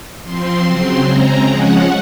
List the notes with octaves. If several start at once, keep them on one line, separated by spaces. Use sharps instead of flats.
F3 C4 C6
C#3 F#3 C4
C#3 G#3 C4 A#5
F3 G#3 C#4 F#5